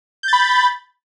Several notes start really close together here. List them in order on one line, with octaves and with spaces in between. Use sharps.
G6 A6 B5